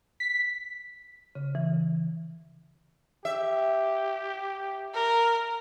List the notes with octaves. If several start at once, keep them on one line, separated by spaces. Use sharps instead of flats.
B6
C#3
E3
G4 E5
A#4